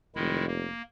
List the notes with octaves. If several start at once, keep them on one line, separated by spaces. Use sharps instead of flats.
F1 D#3 G#3 E4
A#3